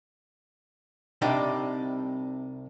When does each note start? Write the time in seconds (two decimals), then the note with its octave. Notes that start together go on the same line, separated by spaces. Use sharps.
1.22 C2 C3 G3 D4 D#4 G5